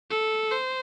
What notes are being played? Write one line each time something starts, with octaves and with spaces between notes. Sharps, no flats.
A4
C5